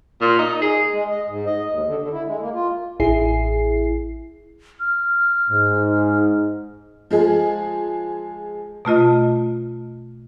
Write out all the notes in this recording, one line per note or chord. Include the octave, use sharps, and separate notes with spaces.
A#2
D#4
G#4
G#3
D#5
G#2
D#5
D#2
D3
D3
E4
G#3
A#3
F4
A1 E4 G#4 C7
F6
G#2
F3 G#3 G#4
B2 A3 F4 D#5